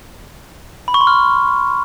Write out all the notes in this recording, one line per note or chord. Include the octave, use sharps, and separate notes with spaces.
B5
C#6
C6
F6